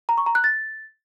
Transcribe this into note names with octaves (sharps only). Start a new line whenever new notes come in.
A#5
C#6
A#5
F#6
A6